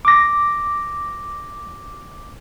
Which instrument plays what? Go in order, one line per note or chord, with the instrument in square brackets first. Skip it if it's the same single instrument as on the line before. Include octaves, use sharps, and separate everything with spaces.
[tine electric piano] D6 A#6